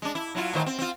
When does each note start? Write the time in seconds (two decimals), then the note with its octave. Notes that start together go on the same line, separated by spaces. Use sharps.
0.02 G#3 D4
0.15 E4
0.35 F#3 E4 F4
0.54 A2 D#3 C5
0.66 C4
0.79 C4 F4